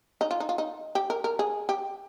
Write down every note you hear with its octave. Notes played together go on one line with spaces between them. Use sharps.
D#4
F4
D#4
F4
D#4
G4
A#4
A#4
G#4
G4